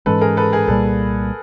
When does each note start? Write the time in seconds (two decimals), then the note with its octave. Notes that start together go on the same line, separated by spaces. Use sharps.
0.06 G#2 E3 G#3 C#4 A4 B4
0.21 G#4 A#4
0.37 A4 B4
0.52 G#4 A#4
0.68 C2 A#2 G3 A#3 A4 B4